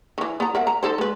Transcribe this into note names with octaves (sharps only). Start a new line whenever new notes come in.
D#3 E3
B3 A#5
A#4 E5 F#5
A#5
D#4 A4 C5
G#3 B4